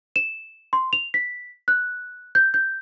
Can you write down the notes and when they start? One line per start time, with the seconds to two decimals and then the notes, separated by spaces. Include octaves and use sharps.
0.16 E7
0.73 C6
0.93 F7
1.14 B6
1.68 F#6
2.35 G6
2.54 G6